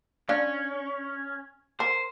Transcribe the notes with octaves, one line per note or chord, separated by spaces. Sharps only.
C#4 D4 F5
A#4 C5